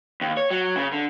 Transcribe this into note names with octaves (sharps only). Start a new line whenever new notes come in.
D#2
C#5
F#3
C#3
D3